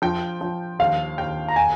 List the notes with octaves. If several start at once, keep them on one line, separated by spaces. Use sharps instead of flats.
F3 G5
F3
D#2 F5
D#2 G5
A#5
G#5